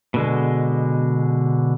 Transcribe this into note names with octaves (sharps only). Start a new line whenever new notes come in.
B2 D3 G#3